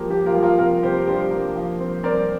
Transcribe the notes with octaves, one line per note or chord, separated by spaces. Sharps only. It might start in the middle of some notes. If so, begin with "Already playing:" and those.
Already playing: F3 A#3 G4
A#3 G4
F4 A#4
F3
F4 A#4
C3 F4 A#4
C3 G4 C5
D4 G4 C5
A#3
F3
C4
C4 A#4 D5